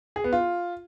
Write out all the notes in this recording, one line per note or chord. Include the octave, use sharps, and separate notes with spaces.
G#4
B3
F4